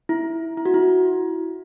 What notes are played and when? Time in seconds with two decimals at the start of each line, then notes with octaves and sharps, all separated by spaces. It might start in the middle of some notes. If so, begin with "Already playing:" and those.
0.09 E4
0.57 E4
0.66 F#4
0.74 E4